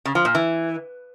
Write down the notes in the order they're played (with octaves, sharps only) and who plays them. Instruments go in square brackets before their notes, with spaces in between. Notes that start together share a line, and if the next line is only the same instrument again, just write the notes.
[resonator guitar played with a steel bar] C#3
F3
A#2
E3